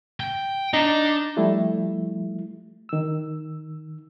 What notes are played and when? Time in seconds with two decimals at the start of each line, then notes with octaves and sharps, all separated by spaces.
0.20 G5
0.74 D4 D#4
1.36 F3 G3 A3 E4
2.89 D#3 E6